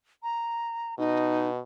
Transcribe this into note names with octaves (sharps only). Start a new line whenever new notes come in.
A#5
B2 D#4